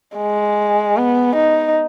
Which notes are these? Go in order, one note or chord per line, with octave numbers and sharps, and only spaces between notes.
G#3
B3
D#4